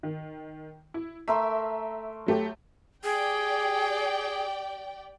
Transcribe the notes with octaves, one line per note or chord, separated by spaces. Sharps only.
D#3
E4
A3 A#4 E5 C6
F#3 A3 G4
G4 G#4 D5 G5